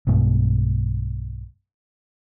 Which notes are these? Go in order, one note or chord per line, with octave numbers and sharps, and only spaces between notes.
B1 G2 B2 G#3